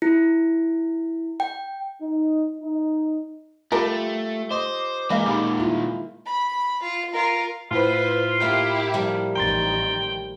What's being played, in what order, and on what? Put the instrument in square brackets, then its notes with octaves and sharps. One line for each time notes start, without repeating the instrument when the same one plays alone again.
[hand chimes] E4
G5
[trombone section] D#4
D#4
[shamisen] G3 A4 A#4 [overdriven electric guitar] A3 [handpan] F4 G4
[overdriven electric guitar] C5 [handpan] D#5 [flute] D6
[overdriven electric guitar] E3 [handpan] G#3 A#3 A#4 [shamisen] D#5 F5
[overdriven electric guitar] A#2 D#3 [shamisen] G3
[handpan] E4 F4
[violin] B5
F4
F4 A#4
[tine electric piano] A2 [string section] E4 B4 C5 [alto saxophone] F4
[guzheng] A#3 F5 G5 [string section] E4 G4
[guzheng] F3 G3 A#3
[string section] A1 D#3 [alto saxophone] G5 [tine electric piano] A#5 C6 A6